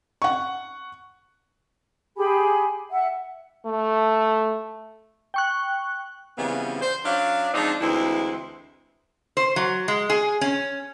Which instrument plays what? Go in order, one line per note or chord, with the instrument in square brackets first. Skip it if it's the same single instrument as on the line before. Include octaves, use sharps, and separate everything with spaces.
[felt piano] F#5 C#6
[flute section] G4 G#4 G#5 B5
E5 F#5
[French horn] A3
[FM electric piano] G5 C#6 F#6
[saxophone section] C#3 E3 F3 G3 B3 C4
C5
F#3 C#4 D4 D5 F5
F3 G#3 C4 D4 D#4
D2 E3 G#3 C4 E4
[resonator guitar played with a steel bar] C5
F#3
G#3
G#4
C#4